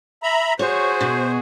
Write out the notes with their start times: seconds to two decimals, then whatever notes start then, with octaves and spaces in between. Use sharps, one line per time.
0.23 E5 A#5 B5
0.59 F#4 G#4 C5 C#5
1.01 B2